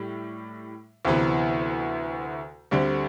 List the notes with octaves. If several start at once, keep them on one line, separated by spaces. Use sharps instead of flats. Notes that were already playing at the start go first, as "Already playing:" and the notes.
Already playing: A2 G3
D2 C3 E3 B3
D2 D3 G3 C4